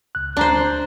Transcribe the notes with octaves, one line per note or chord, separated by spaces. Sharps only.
C#2 F#6
D2 D4 C5 A#5